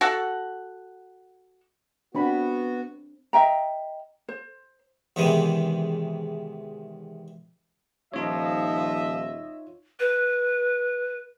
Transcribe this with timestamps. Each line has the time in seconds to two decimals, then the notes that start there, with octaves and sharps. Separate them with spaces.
0.01 F#4 A4 F#5
2.15 B3 C4 D4 F#4 B5
3.33 D#5 E5 G5 A#5
4.29 C5
5.16 E2 G#2 C3 D#3 E3 G#3
8.14 D#1 F3 D#4 F4 C#5 D#5 E5
10.00 B4